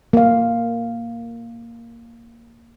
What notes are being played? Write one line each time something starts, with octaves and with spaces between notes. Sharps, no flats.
A#3 F5